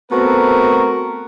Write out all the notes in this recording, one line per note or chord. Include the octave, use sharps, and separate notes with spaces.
A3 B3 C4 F#4 A#4